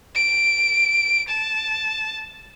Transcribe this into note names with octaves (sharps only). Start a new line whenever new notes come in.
D7
A5